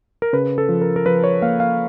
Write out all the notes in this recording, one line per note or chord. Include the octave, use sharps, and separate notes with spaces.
A#4
C#3 B4
A4
F3
A#4
A#4
F3 B4
C#5
A#3 F5
F5